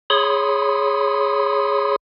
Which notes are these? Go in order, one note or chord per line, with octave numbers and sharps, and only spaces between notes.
G#4 C#5 B5 C6 D#6